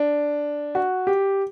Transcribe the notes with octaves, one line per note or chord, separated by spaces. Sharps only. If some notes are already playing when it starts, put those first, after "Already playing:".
Already playing: D4
F#4
G4